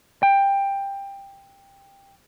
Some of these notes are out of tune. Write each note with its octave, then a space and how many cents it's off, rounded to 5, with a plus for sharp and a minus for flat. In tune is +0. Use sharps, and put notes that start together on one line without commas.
G5 +15